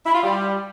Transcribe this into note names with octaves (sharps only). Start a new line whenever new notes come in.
E4
F4
G3